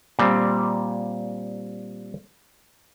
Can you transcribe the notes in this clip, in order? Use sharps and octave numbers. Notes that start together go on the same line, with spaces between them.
A#2 G3 C4